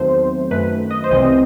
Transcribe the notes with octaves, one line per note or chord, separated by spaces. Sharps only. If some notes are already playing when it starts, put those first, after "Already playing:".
Already playing: E2 D#3 F#3 A3 C4 C5
F#2 D#3 A3 B4
D#5
C5
C2 C3 E3 G3 C4 D#5